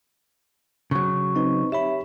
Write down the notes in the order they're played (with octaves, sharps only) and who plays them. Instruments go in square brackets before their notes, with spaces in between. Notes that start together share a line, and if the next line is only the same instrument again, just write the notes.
[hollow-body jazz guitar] C#3 F#3 [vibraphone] C#6
[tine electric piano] C4 D#4 B4
[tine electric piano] G4 C#5 B5 [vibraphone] E5